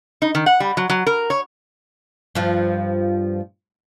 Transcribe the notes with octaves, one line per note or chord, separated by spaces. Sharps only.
D#4
D#3
F#5
G3
F#3
F#3
A#4
C#5
G2 F3